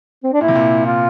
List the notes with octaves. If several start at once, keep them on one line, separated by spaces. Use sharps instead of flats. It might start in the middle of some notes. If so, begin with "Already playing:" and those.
C4
D4
A#2 E4
C3
A#2
F4